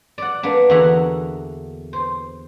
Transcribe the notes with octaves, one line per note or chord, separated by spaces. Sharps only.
D5 F#5
A#3 B3 D4
E2 D3 E4 F#4 E5 A#5
C5